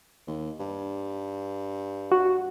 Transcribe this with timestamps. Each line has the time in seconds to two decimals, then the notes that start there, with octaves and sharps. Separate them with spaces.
0.27 D#2
0.60 G2
2.12 F#4